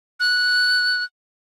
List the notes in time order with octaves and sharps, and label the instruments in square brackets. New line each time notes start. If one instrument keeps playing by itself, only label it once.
[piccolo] F#6